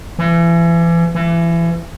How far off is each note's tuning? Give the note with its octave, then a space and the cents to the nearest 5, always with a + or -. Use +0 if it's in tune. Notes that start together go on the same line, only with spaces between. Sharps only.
E3 +35
E3 +30